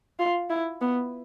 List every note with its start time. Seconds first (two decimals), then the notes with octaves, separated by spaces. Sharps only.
0.19 F4
0.50 E4
0.81 B3